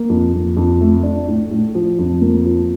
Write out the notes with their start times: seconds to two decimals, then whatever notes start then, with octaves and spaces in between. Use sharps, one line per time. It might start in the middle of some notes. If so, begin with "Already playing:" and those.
Already playing: A#3
0.10 F2
0.34 F2
0.57 F2
0.81 A3
1.03 D4
1.28 A2
1.51 A2
1.75 F3
1.99 F2
2.21 A#3
2.45 F3